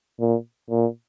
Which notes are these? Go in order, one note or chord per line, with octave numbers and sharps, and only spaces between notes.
A#2
A#2